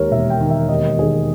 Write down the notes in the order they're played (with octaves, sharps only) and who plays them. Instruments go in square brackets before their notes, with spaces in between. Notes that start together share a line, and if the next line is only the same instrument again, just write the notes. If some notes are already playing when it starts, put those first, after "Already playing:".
Already playing: [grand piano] D#2 G#3 A#4 C#5
E1 E5
G5
D#3
E5
D#2 D#5
D#3 G#4